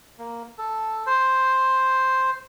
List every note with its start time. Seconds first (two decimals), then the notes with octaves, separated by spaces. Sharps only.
0.19 A#3
0.58 A4
1.06 C5